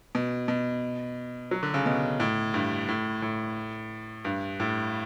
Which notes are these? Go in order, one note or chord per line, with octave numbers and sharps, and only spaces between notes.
B2
B2
F#3
D3
C#3
B2
A2
G2
A2
A2
G2
A2